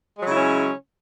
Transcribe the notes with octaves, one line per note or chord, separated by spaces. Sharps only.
C#3 F#3 G#3 C#4 E4